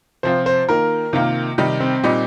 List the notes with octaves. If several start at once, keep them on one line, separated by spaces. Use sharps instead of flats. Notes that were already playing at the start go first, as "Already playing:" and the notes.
C3 F3 C4 F4 C5
C5
D#3 A#3 F4 A#4
C3 D#3 A#3 F4
C3 D#3 G3 D#4
C4
A#2 G3 D#4